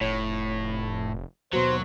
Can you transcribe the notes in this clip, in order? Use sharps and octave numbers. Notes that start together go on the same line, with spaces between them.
F1 A2 C#5
D#2 B2 F#3 B3 F#4 C5